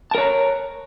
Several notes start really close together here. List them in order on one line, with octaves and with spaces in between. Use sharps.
A5 A#4 C#5 A#5